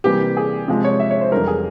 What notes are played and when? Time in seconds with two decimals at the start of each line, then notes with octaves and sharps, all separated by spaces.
0.04 C3 E3 G3 A#3 G4
0.37 G#4
0.68 C3 F3 G#3
0.84 C#5
0.99 E5
1.10 C#5
1.21 C5
1.32 F2 E3 G3 A#4
1.48 G#4